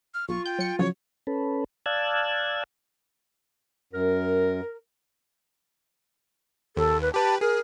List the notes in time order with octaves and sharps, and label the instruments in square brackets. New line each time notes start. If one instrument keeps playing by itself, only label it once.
[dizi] F6
[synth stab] B1 [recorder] F4 [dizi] C#6
[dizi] G5 [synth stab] G6
[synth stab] F#3 C#7
[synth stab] C#3 F3 F#3 [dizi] C#5
[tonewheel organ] C#4 A4 B4
D5 F5 A5 E6 F#6 G#6
[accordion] F#2 [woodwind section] A#4
[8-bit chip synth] D#2 [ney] A4
[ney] B4
[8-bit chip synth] G4 B4 [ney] A5
[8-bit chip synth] G#4 [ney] A#4